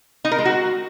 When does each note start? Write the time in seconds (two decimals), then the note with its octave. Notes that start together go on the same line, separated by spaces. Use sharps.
0.25 D#4
0.31 A#4
0.38 G#3
0.45 F#4